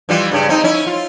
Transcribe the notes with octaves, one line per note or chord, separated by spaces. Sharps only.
E3 G3 F4
G2 C#3
C4 D#4
C#4 E4
F4